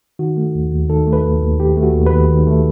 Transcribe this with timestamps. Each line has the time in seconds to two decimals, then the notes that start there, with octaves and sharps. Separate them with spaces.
0.19 D#3 F#4
0.37 A3
0.55 D#2
0.72 D#2
0.89 D#3 A4
1.07 A3
1.13 B4
1.24 D#2
1.42 D#2
1.60 D#3 G4
1.77 A3
1.83 F#4
1.94 D#2
2.06 B4
2.12 D#2
2.30 D#3
2.47 A3